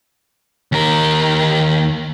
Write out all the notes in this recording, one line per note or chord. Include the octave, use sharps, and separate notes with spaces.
D#2 A#4